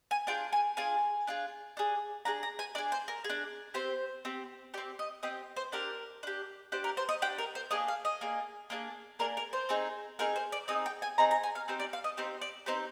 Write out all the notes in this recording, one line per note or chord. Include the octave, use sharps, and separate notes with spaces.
G#5
D4 F4 G#4 G5
G#5
D4 F4 G#4 G#5
D4 F4 G#4
D4 G#4
D4 G#4 A#5
A#5
G#5
D4 G#4 D5
C5
A#4
G#4
D4
C4 G4 C5
C4 G4
C4 G4 D5
D#5
C4 G4 D#5
C5
D4 G4 A#4
D4 G4
D4 G4 C5
A#4
C5
D#5
D4 G4 G5
A#4
C5
A#3 D4 G#4 D#5
F5
D#5
A#3 D4 G#4
A#3 D4 G#4
A#3 D4 G#4 A#4
A#4
C5
C4 D#4 G#4
C4 D#4 G#4 A#4
C5
D5
C4 D#4 G#4 D#5
G5
G#5
C4 D#4 G#4 A#5
A#5
G#5
F5
C4 D#4 G4 C5
D5
F5
D#5
C4 D#4 G4 C5
D5
C4 D#4 G4 C5